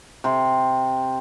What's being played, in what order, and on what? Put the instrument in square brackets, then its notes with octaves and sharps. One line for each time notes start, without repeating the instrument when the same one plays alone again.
[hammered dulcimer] C3 C6